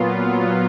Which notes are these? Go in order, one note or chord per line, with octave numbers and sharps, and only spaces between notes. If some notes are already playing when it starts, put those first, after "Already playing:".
Already playing: A#2 F#3 B3 F4